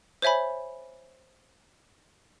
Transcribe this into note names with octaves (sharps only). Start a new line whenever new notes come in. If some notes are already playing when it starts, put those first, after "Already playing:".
C5 C#5 E5 G#5 B5